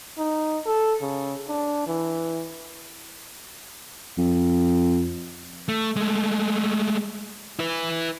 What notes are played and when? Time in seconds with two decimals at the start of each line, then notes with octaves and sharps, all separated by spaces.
0.19 D#4
0.67 A4
1.02 C#3
1.48 D4
1.87 E3
4.18 F2
5.68 A3
5.96 G#3 A3
7.59 E4 B4